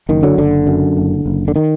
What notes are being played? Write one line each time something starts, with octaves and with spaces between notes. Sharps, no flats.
F#1 D#3
D3 F#3
F#1 D3
F#2
F#1
F#1
D3
D#3